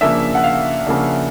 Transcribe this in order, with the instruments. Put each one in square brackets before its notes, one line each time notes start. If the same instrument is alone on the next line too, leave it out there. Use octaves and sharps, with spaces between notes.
[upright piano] C#3 F3 A#3 D4 [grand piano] E5
[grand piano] F#5
F5
[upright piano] C#3 F3 A#3 D4